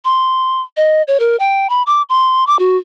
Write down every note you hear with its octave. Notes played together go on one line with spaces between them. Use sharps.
C6
D#5
C#5
A#4
G5
B5
D6
C6
D6
F#4